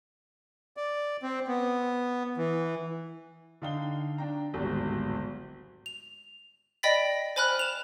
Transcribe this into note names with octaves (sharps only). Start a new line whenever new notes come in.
D5
C4
B3
E3
D3 D#4 F5 G5 G7
D4 G5 A#5
D1 G#1 G#2 B2 G3 F#4
F7
D5 D#5 G5 B5 A6 B6
C5 G#5 B5 F6 F#6
E7 F7